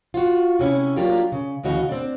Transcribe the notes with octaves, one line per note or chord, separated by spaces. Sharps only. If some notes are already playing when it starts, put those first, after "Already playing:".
F4 F#4
C3 C#4 E4
F#3 A#3 D4 F4 G4
C#3
D2 C#3 E3 F#4 D#5 F5
C4 D4